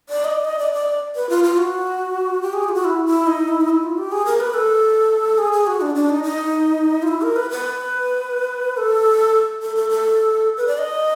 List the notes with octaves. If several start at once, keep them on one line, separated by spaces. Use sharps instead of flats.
D5
D#5
D5
D#5
D5
D5
B4
F4
F4
F#4
G4
G#4
G4
F4
F#4
E4
E4
D#4
E4
D#4
E4
F4
G4
G#4
A#4
B4
A4
G#4
G#4
F#4
D4
D4
D#4
D#4
F4
E4
A#4
B4
B4
A4
A4
A4
A4
B4
D5
D#5